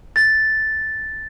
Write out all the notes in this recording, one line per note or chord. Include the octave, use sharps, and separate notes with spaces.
A6